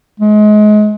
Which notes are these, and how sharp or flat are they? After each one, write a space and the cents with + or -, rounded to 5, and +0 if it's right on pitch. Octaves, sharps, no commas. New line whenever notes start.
G#3 +30